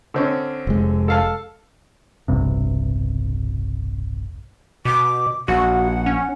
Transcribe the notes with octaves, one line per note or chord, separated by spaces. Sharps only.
D3 C4 C#4
F1 G#3
A4 F5 A5
E1 B1 G2 C3
B2 D6
A#1 F#4 F#5
C#4